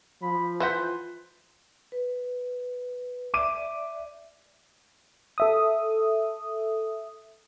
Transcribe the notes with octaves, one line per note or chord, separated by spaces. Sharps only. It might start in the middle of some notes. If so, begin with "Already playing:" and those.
F3 B5
E3 F4 B4 C5 F#5 G6 B6
B4
D5 E5 D6 D#7
A4 E5 D#6